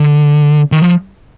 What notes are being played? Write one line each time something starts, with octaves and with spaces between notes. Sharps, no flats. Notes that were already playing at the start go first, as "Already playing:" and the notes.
Already playing: D3
D#3
F3